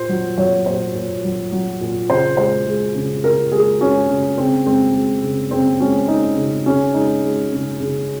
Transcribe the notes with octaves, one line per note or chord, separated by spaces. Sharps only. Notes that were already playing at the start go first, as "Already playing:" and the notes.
Already playing: A#2 C5
F#3
F#3 C#5
A#2 C5
A#2
F#3
F#3
A#2
C#3 C5
G#3 C5
G#3
C#3
C#3 A#4
G#3 G#4
G#3 C#4
C#3
C#3 C4
G#3 C4
G#3
C#3
C#3 C4
G#3 C#4
G#3 D#4
C#3
C#3 C#4
G#3 D#4
G#3
C#3
C#3